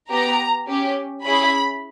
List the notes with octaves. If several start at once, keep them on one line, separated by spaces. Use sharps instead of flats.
B3 G4 A#5
C#4 G4
C#4 E4 G#4 B5